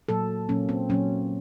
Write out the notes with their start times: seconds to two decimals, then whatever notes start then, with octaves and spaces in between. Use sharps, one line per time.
0.09 A#2 F#3 A#3 A4
0.49 A#2 F#3 A#3 C#4
0.69 C4
0.89 A#2 F#3 A#3 C#4